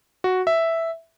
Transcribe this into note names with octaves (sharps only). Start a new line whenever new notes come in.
F#4
E5